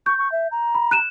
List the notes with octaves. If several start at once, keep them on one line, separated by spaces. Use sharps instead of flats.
C#6 G6
C#6
E5
A#5
B5
F#6 D#7 E7